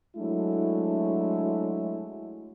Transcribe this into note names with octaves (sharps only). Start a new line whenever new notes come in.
F#3 G#3 A3 D4 E4